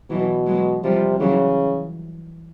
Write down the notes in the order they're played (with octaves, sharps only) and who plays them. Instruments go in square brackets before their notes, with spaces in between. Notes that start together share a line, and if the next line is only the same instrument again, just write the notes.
[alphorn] B2 [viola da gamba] E3 F#3
[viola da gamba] F#3 G#3
[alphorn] C3 [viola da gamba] F3 G3
[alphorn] C#3 [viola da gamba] E3 F#3